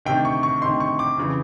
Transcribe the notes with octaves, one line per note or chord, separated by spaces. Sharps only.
D2 C3 D#3 G5
C#6
C#6
D2 C3 D#3 C6
C#6
D6
F2 C#3 E3